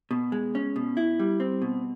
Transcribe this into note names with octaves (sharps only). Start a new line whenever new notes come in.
B2
G#3
C#4
B2
E4
G3
C4
B2